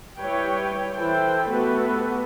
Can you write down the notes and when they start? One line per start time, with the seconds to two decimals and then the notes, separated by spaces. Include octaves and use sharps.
0.19 G3 E4 G4 B4 C#5 G5
0.95 E3 E4 A4 C5 G5
1.48 A3 B3 F#4 G4 A4 B4